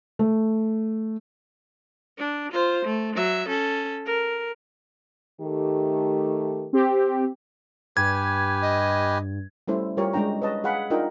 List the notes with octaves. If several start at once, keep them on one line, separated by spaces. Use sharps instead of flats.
A3
D4
F4 C5
A3
F#3 E5
C#4 A4
A#4
D#3 A3 G4
C4 G4
G2 G4 B4 G#5 G#6
D#5
G3 A3 C#4 E4 A4 C5
G3 F4 G4 A#4 C#5
G#3 C#4 D4 G5 A#5
B4 C#5 D#5 A5
G#4 F5 F#5 B5
D4 D#4 F4 A#4 D#5 G5